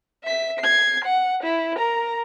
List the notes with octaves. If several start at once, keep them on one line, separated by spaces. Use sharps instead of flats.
E5 B6
G#6 C7
F#5
E4
A#4 A#5